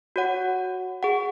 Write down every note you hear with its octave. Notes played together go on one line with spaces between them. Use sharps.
F#4 C#5 F#5
G#4 F#5